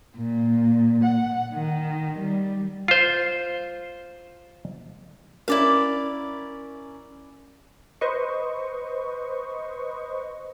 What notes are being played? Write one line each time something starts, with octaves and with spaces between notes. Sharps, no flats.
A#2
F#5
D#3
G3
F4 C5
C#4 E4 A#4 D5 F5
B4 C5 D#5 C#6